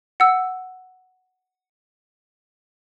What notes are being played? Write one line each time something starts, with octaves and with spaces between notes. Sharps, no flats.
F#5 E6